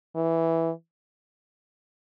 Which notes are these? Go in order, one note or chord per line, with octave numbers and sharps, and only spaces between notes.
E3